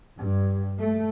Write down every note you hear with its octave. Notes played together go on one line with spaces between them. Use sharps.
G2
A3